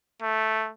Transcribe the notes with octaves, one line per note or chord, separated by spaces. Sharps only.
A3